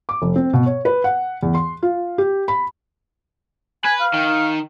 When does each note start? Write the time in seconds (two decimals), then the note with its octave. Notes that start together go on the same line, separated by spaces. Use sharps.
0.09 D6
0.22 F1
0.36 C4
0.53 B2
0.66 C#5
0.85 B4
1.04 F#5
1.43 E2
1.55 C6
1.83 F4
2.18 G4
2.48 B5
3.85 B4 G#5
4.01 F5
4.13 D#3